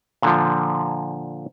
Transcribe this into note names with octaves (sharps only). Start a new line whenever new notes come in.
A#2 D3 F3